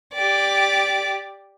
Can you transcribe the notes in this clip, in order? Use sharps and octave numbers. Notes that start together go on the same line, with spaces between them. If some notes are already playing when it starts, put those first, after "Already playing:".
G4 D5